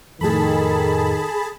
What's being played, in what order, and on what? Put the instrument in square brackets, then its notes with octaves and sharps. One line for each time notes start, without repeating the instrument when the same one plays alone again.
[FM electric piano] F2 A2 [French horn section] D#3 [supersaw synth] G#4 A5 B5 [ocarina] A4